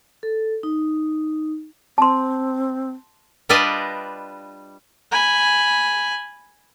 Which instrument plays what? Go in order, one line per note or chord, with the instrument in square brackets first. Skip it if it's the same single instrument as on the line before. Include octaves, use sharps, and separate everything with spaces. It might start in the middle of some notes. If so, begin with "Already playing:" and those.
[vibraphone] A4
D#4
[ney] C4 [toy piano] A5 C6
[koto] G3 D4 F4 B4 D5 D#5
[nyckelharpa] G#5 B5